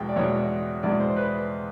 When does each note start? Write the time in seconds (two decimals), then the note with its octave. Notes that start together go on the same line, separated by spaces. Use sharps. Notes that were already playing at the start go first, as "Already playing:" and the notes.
Already playing: E2 B2 G#3 G5
0.09 D5
0.16 E2 B2 G#3 C#5
0.83 E2 B2 G#3 D5
1.00 C5
1.17 B4